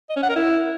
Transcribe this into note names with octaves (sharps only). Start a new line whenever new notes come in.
D#5
C#4
F#5
A#4
E4